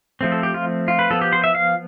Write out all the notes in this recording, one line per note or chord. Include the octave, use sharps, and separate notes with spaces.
F3 A3 C4
A4
G4
F4
F4
B4
F3 B3 A4
G4
C5
E5
F5